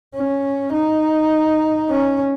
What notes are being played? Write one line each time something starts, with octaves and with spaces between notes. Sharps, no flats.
C#4
D#4
C#4